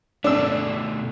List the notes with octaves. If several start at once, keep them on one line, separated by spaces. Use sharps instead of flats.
B2 A3 D4 E6